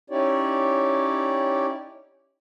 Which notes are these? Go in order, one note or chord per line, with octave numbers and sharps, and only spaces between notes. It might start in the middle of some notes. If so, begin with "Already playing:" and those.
C#4 D#4 E4 G4 C#5 D5